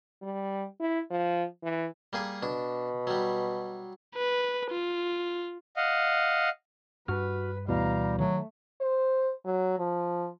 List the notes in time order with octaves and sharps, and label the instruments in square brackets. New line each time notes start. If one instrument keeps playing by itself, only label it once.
[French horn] G3
E4
F3
E3
[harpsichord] G3 A#3 G#4
[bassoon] B2 [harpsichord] D4
[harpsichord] F#3 G3
[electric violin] B4
F4
[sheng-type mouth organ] D#5 F5 F#5
[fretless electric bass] G2 [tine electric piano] F#4 F6 [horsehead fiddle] B4
[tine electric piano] D2 B2 E3 [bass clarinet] G3 [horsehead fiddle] F5 A#5
[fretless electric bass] D#3 [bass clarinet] F#3 [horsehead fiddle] A3
[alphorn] C5
F#3
F3